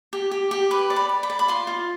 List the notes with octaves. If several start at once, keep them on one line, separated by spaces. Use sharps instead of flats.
G4
G4
G4
B4 D6
D5
B5
D5
B5
D5
B5
F4 C6
F4